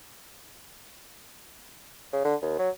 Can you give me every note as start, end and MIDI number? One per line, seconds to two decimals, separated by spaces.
2.13 2.21 49
2.25 2.35 50
2.42 2.55 39
2.59 2.70 54